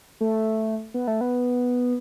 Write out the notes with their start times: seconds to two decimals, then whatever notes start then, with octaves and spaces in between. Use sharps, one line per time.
0.21 A3
0.94 B3
1.07 A3
1.21 B3